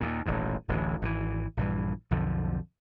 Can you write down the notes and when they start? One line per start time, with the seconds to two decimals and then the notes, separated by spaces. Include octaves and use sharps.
0.01 D#2 A#2
0.26 D#1 A1 D#2 G#2
0.68 D1 A1 D2 E3
1.02 G#1 D3 E3
1.57 A#1 G2 E3
2.11 B1 F2 D3 F3